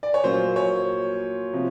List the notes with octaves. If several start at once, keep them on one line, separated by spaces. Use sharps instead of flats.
D5
C#5
A#2 F#3 A#3 C#4 C5
C#5
C3 F3